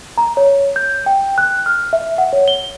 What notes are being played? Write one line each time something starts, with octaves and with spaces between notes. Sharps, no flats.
A#5
C#5
G6
G5
F#6
F6
E5
F#5
C#5
G7